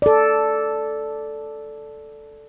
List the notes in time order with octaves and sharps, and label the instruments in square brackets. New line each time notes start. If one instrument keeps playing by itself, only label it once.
[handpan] A4 D5